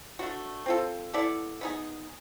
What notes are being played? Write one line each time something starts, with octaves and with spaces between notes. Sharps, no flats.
A3 D4 F#4
C4 F4 A4
B3 E4 A4 D5
B3 D#4 G#4